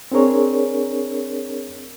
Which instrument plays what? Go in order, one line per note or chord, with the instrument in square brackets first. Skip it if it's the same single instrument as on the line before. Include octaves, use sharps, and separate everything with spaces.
[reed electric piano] C4 D4 G#4 A#4 C#5